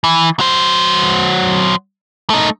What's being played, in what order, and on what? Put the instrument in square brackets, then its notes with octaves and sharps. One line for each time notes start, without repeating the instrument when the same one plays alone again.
[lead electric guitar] E3
F#3 C5
A3 D#4